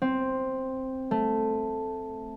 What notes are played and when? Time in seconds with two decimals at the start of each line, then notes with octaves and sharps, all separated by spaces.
0.02 C4
1.11 A3